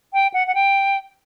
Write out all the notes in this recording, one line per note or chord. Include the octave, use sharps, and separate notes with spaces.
G5
F#5
F#5
G5